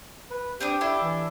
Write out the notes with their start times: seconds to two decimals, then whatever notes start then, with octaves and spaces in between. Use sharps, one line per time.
0.31 B4
0.60 C4 D4 G4 D#6
0.81 D4 E4 A4
1.02 E3